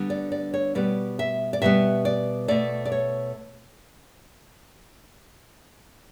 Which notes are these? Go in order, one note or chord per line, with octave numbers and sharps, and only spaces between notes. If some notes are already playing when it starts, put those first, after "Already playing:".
Already playing: D3 G3 B3
D5
D5
C#5
B2 G3 B3 D5
E5
D5
B2 G3 B3 E5
D5
B2 A3 D5
D5
C#5